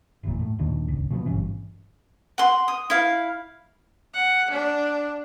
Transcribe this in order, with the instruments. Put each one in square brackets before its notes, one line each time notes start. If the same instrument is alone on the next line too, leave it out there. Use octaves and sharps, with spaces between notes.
[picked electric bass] F#1 E2 A#2
A2
D#2 A#2 D#3 D4
G1 C#2
B2 F3 A#3 B3
G#1 G2 E3 C#4
[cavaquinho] F#5 C6
D#6
E4 F5
[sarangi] F#5
D4